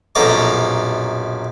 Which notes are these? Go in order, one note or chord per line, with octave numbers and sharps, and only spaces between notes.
A#1 F#2 B2 A4 A#5 D6